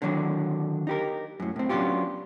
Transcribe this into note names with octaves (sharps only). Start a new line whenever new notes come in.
D3 D#3 F#3 D4
D#4 G4 A#4
F#2 A2
A2 C4
F#3 B3 C#4 D4 F4 G4